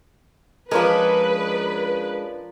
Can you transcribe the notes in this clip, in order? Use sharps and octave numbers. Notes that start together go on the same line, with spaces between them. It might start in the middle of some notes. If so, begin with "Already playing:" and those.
F3 G#3 C#4 D4 A#4 B4